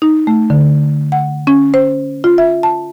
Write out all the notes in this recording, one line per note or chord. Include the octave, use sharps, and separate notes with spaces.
D#4
A3
D3
F#5
C#4
C5
F4
E5
A5